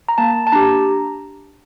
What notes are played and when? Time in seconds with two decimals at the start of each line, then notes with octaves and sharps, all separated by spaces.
0.09 A#5
0.18 A#3 A5
0.47 A5
0.52 D4 G4 A#5